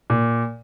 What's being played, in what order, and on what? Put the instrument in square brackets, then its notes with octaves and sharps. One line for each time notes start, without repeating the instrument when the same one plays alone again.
[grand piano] A#2